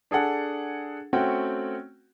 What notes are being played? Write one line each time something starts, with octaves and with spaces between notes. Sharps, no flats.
D4 G#4 A4 F#5
A3 C4 C#4 F#4 F#5 G5